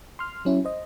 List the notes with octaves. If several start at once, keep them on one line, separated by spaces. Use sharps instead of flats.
C6 F6
F#3 C#4 E4
C5 D#5